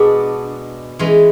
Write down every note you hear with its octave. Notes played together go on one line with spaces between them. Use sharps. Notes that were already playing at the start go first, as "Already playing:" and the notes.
Already playing: B2 G#3 B3 D4
E3 G#3 C#4